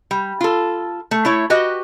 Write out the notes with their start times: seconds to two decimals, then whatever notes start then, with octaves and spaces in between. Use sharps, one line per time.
0.11 G3
0.41 F4 A4
1.11 A3
1.25 A3 E4 C#5
1.50 F#4 G4 B4 D#5